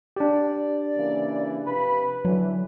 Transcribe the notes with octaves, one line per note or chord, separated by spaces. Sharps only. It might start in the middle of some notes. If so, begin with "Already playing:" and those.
D4 G4 D5
C#3 E3 A#3
C3 F3 B4 B5
D3 E3 F#3